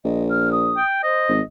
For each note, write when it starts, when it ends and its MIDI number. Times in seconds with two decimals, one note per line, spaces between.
0.04 0.80 34
0.04 0.23 75
0.29 0.49 89
0.52 0.84 87
0.77 0.98 79
1.03 1.32 72
1.03 1.41 75
1.29 1.41 32